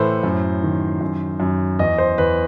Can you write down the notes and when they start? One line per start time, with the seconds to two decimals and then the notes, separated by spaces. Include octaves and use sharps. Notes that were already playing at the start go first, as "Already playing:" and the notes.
Already playing: A2 E3 A4 B4 C5
0.23 F#2
0.63 D#3
1.01 F#2
1.40 F#2
1.79 E2 D#5
1.98 C5
2.18 E2 B4